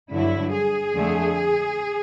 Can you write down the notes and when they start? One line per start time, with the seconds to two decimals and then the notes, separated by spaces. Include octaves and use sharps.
0.11 G2 D3 F#3 E4
0.52 G#4
0.92 F2 D3 F3 A3